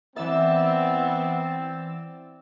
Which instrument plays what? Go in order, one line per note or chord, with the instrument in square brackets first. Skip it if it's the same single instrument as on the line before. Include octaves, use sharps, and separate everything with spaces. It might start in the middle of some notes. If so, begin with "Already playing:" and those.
[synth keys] E3 E6 A6 [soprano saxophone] B3 [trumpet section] C4 [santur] D5 E5